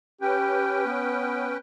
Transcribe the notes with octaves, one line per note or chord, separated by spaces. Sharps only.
C#4 G4 B4 G5
B3